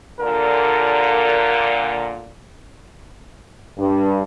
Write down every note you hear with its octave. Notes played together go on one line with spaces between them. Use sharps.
A#2 D3 A#4
G2